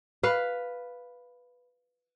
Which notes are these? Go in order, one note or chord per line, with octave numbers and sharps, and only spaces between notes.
B4 F5